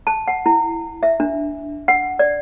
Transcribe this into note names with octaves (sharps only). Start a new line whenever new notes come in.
A5
F#5
E4
E5
D4
F#5
D5